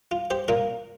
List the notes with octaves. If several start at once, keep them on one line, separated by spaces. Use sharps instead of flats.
F4
G4 C5
A#2 A#3 F4 A#4